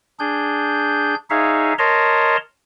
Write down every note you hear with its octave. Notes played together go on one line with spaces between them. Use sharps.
D4 G#4 G6
D#4 G#4 C#5 E5 F5
A#4 C#5 D#5 A5 A#5 C6